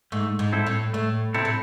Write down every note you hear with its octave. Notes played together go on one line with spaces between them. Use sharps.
G#2 A3
G#2
C4 E4 A4
A2
A2 A3
C3 C4 E4 A4
A2